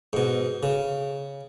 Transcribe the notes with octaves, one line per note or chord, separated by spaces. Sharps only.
G#2 B2
C#3